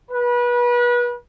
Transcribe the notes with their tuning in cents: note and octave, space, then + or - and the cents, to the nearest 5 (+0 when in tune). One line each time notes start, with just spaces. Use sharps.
B4 -30